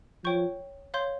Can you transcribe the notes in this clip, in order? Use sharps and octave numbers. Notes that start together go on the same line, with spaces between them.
F3 C#5 G5 C#6 G6
C#5 F5 C6 G6